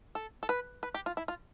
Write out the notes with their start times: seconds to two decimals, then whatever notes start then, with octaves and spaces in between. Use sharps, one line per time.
0.15 A4
0.43 A4
0.49 B4
0.83 B4
0.94 G4
1.06 F4
1.17 E4
1.28 F4